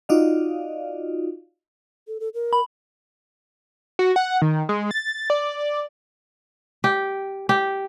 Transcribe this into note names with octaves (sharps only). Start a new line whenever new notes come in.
D#4 F4 F#4 D5 D#5 F5
A4
A4
A#4
B5
F#4
F#5
D#3
G#3
A6
D5
G4
G4